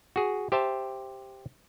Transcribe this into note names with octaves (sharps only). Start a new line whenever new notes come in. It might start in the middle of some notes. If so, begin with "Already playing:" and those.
F#4 G#4
G4 C5 E5 A5